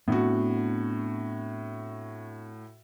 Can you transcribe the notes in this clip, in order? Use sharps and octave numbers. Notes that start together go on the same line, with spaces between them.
A2 B3 C4 D4 F#4